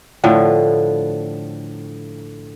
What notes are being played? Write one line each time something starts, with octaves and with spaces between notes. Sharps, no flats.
A2 D3 F3